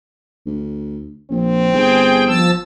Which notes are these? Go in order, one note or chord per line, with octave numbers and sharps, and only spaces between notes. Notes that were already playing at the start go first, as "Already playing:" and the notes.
D2
A#1 C4
G1 G#4 G5
F3 A5 E6